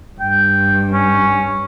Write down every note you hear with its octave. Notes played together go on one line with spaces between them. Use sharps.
G2 G5
C#4